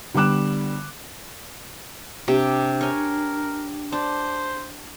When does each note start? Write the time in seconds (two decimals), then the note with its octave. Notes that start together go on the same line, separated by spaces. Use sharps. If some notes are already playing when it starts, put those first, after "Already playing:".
0.14 D3 G3 B3 D6 F#6 E7
2.28 C3 D4 G4
2.81 A#4 C#5 G#5
3.92 D4 C5